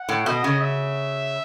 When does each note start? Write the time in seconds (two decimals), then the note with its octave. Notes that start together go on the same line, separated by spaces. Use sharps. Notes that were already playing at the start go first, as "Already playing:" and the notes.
Already playing: F#5
0.09 A2
0.26 B2 D#5
0.44 C#3
0.61 E5